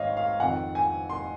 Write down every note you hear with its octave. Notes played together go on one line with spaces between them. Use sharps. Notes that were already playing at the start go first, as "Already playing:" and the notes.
Already playing: G#2 D#3 C#5 D#5 F5
F5
F2 D#3 F#5
G#5
C6